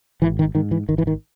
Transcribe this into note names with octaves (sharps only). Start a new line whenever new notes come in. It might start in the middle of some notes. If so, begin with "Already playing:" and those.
G#1 E3
D#3
G#2 D#3
E3
G#1 D#3
E3
D#3